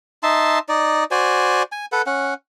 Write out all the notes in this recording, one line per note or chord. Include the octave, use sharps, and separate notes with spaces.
D#4 E5 A5 C6
D#4 D5
F#4 C5 D5 G#5
G#5
A4 B4 F#5
C#4 F#5